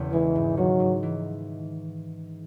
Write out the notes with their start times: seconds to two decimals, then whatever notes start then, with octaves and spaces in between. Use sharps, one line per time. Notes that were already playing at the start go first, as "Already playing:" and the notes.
Already playing: E1 E2 C#3
0.12 E3 G#3
0.35 G#2
0.57 D#3 F#3
0.80 G#2
1.03 E3